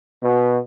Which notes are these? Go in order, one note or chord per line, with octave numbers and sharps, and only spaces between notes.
B2